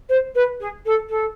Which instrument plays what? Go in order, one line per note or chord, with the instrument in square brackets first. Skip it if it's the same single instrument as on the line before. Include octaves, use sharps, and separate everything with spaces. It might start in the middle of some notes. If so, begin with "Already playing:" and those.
[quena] C5
B4
G#4
A4
A4